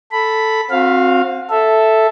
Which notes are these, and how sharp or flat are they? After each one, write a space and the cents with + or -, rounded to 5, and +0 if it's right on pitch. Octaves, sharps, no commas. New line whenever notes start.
A4 +0 B5 +0
C4 +15 F#4 -30 F5 +0
A4 +0 E5 +0